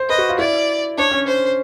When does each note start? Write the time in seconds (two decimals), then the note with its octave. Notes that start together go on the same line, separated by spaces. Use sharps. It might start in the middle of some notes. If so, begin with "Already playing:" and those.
Already playing: C5
0.09 B4 D#5
0.18 F#4
0.29 F4
0.38 E4 D5
0.98 D4 C#5
1.11 C#4
1.27 C5